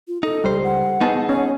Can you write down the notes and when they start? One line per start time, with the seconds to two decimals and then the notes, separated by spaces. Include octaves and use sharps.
0.08 F4
0.23 D#4 A4
0.44 C#2 G3 C5
0.64 F#5
1.01 B3 D#4 G#4 A5
1.29 C#4 C#5